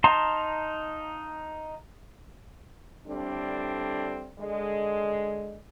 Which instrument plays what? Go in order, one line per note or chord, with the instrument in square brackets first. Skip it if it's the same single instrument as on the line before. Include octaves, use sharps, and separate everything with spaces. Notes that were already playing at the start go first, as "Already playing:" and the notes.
[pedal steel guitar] D#4 F5 A5 A#5 C6
[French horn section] A2 D3 G3 C4 D4
D3 G#3